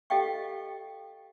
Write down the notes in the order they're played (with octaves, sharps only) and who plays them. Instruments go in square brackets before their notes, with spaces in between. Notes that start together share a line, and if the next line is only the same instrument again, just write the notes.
[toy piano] G4 A4 D#5 F5 G5 C#6